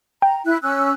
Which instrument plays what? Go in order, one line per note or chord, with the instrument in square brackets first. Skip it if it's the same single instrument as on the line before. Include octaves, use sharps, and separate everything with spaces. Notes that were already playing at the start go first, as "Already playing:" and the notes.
[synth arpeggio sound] G5 [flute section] A#5
[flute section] E4 F#6
C#4 E6 F#6